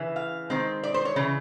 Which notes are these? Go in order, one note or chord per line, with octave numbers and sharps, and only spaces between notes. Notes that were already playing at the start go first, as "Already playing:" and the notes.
Already playing: C#3 E3
F5
D#3 G#3 C4
D5
C5
C#5
C#3 E3